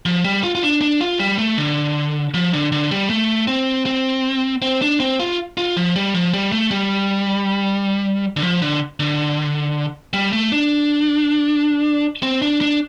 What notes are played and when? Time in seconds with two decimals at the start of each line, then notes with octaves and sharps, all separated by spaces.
0.06 F3
0.25 G3
0.43 F4
0.55 F4
0.63 D4
0.81 D4
1.01 F4
1.19 G3
1.39 A3
1.58 D3
2.34 F3
2.53 D3
2.72 D3
2.91 G3
3.10 A3
3.47 C4
3.86 C4
4.62 C4
4.82 D4
5.00 C4
5.20 F4
5.57 F4
5.77 F3
5.96 G3
6.14 F3
6.33 G3
6.52 A3
6.71 G3
8.37 D3
8.43 F3
8.62 D3
9.00 D3
10.13 G3
10.33 A3
10.52 D4
12.23 C4
12.42 D4
12.61 D4